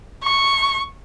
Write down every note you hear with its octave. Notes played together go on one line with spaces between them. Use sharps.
C#6